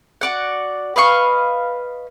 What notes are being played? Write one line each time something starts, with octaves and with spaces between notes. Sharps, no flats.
F#4 D5 F#5
B4 D#5 F5 C#6